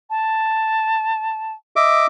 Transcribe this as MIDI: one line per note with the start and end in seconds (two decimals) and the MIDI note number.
0.10 1.53 81
1.76 2.07 75
1.76 2.07 76
1.76 2.07 86